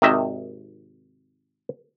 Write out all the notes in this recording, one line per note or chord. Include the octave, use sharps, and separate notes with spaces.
G#1 C3 D#3 D#5 E5